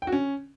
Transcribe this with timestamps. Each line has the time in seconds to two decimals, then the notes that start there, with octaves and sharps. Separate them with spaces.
0.02 G5
0.07 F#4
0.12 C#4